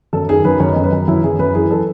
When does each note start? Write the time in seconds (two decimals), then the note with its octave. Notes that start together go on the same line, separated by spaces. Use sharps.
0.13 F#2 A4
0.29 D#3 G#4
0.45 F#2 B4
0.60 F#2 C#5
0.72 D#5
0.76 F#2
0.84 B4
0.93 F#2
1.08 F#2 E4
1.24 F#2 G#4
1.39 F#2 B4
1.55 E3 G#4
1.71 A4